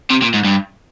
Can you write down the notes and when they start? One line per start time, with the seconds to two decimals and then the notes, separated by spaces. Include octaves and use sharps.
0.10 C3
0.22 A#2
0.34 G#2
0.45 G2